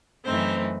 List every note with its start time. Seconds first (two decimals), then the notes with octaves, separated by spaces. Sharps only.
0.24 F#2 E3 A3 C4 D#4 C5